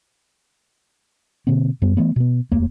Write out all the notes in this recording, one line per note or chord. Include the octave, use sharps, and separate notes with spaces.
B2 D3 A#3 C4
F#2 G3 B3
E3 A3 B3
B2 B3
D#1 F2 A3 A#3